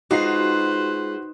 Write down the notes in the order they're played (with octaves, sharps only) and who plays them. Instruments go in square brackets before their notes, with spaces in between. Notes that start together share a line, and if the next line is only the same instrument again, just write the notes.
[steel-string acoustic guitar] G#3 F4 [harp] D#4 [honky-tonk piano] F#4 C7 [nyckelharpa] B4 C5